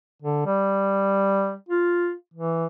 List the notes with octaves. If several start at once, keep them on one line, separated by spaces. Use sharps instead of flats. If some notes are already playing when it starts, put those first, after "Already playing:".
D3
G3
F4
E3